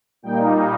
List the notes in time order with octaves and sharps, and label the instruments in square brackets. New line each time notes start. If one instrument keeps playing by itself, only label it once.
[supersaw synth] A#2 G3 A#3 D#4 G5